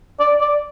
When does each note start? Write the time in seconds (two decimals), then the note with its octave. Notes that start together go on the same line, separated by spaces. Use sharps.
0.20 D5
0.41 D5